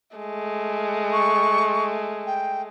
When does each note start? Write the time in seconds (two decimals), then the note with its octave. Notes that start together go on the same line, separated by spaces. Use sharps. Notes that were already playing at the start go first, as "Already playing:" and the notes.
0.16 G#3 A3
1.13 C#6
2.27 G5